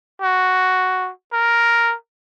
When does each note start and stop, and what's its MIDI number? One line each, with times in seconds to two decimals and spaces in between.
0.22 1.10 66
1.33 1.95 70